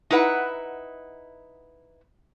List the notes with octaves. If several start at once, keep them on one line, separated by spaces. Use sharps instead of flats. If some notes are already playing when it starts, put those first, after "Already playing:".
D#4 E4 B4 F#5 A#5